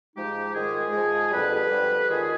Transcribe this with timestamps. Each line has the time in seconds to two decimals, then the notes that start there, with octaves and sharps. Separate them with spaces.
0.16 G#2 F3 G#3 D#4 G4
0.54 G#2 D#3 G#3 F4 G#4
0.93 G#2 F3 G#3
1.31 F2 D3 G3 G4 B4
1.70 F2 D3 G3
2.09 D#2 D#3 G#3 F4 G#4